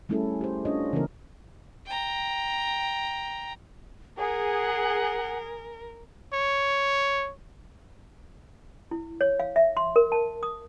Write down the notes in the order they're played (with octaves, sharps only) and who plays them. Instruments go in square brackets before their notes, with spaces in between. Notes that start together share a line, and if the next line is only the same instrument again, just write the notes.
[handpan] G3 A3 C#4 E4 G#4 A4
G4 C5
C#4 D4 F4 C#5 D#5
C#3 E3 A#3 C4 E4 A#4
[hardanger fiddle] G5 A#5
[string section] G#4 [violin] A#4 [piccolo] F#5
[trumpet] C#5
[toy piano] E4
C#5
F5
E5
C6
A#4
A5
D#6